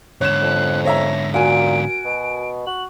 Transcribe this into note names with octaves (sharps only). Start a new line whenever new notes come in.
G#2 D3 C#5 F#6 E7
F2
C#5 E5 A#5 A#6
A#2 F#4 A#4 G#5 D7
B2
F#4 F#7